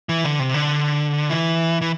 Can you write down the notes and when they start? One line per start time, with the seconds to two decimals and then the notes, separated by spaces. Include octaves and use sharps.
0.09 E3
0.24 D3
0.39 C3
0.54 D3
1.29 E3
1.82 E3